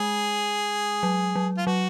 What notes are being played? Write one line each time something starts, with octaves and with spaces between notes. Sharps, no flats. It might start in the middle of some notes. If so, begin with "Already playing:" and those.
Already playing: G#3 G#4
F#3
F#3
F4
F#3 F#4